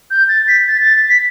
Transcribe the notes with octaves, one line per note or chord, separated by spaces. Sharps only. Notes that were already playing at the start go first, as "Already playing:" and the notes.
G6
A6
B6
A6
A6
B6